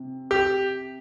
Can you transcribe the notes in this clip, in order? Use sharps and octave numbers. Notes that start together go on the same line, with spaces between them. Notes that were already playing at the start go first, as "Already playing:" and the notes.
Already playing: C3
G4